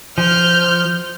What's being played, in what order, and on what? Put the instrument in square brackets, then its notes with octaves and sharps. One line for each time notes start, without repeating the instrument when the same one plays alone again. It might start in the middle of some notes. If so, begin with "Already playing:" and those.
[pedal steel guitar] F3 [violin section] F6 G6